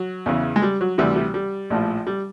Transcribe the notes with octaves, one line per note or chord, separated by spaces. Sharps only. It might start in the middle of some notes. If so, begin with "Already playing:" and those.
Already playing: F#3
E2 C#3 E3
G#3
G3
F#3
D2 C3 E3 G3
G3
G3
A#1 A2 F3
G3